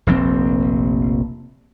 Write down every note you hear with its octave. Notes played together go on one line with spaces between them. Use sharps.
F1 A#1 C3 C4